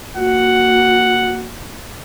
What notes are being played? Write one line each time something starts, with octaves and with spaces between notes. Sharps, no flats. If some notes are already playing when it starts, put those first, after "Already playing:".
A#3 F#4 F#5